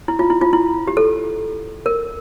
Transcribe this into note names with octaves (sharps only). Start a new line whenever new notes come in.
E4
F4
E4
F4
E4
G4
A4
A#4